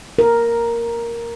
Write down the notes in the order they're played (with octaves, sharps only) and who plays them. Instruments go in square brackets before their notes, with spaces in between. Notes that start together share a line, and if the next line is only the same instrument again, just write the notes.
[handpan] A#4